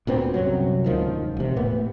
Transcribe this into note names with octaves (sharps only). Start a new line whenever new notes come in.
D2 A#2 B3 C4
C2 F#2 C3 F#3
D1 C#2 D#3 F3
E1 C3
A2 A#3 B3